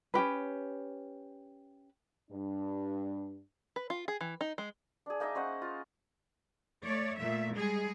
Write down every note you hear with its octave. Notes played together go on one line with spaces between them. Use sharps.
C#4 D4 G4 B4
G2 D4
B4
F4
G#4
E3
D#4
G#3
D4 G#4
A#3 D#4 D#5 E5
C#4 C5 D#5 F#5
F4
A3 C#5 D5
A#2 A3 E5
G3 G#3 G#4